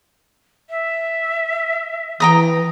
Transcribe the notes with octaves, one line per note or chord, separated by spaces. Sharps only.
E5
E3 G5 A#5 D#6